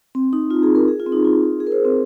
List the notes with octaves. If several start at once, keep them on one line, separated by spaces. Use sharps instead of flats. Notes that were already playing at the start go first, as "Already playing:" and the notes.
C4
D#4
F4
G#4
A#4
G#4
F4
C4
D#4
F4
G#4
A#4
C5
C4